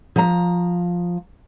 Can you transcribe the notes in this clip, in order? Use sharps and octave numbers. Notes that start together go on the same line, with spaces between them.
F3 A#5